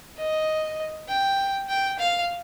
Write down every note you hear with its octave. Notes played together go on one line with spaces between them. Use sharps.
D#5
G5
G5
F5